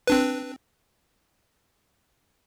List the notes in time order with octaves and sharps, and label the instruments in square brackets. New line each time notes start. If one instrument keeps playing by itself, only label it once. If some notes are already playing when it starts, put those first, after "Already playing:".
[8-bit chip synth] C4 D4 B4